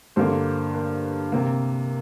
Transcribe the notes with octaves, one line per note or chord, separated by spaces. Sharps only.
G2 D3 A#3 C5
A#4
C3 A#3